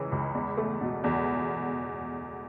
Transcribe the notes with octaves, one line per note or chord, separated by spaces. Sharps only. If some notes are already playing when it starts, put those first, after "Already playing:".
Already playing: C#2 C#3 E3
C#2
E2
A3
B2
E2